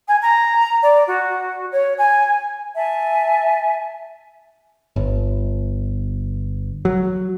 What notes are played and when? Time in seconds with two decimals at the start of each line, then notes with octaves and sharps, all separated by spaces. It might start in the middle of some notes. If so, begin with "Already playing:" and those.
0.08 G#5
0.22 A#5
0.83 D5
1.08 F#4
1.72 C#5
1.98 G#5
2.76 E5 G#5 A5
4.96 G1
6.85 F#3